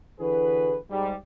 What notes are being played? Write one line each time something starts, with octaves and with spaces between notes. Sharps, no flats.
D3 E3 F#4 G#4 B4
G#2 G3